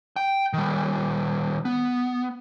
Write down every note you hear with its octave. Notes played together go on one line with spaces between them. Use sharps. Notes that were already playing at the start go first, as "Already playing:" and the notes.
G5
D#3 G3
B3